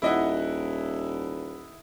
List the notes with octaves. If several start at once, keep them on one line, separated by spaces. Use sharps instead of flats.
D#1 E4 D#5 F#5